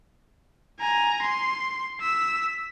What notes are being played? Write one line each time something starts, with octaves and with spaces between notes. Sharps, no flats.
G#5 A#5
C6
E6 B6